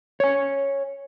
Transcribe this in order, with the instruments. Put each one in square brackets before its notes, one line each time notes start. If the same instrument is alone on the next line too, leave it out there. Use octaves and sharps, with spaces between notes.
[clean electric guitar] C#5 G#5